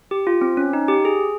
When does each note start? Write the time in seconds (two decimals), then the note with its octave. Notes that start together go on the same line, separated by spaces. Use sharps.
0.11 G4
0.27 F4
0.41 C4
0.57 C#4
0.73 D#4
0.88 G4
1.05 G#4